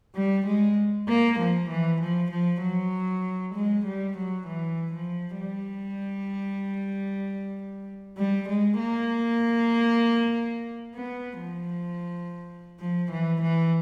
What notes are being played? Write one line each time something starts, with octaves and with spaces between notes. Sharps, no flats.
G3
G#3
A#3
F3
E3
F3
F3
F#3
G#3
G3
F#3
E3
F3
G3
G3
G#3
A#3
B3
F3
F3
E3
E3